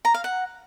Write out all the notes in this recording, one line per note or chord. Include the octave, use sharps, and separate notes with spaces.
A#5
F5
F#5